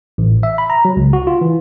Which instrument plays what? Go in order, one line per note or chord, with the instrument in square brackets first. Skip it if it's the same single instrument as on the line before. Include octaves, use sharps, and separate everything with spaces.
[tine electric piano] A1
E5
B5
A#5
F#3
C#2
F#4
F4
E3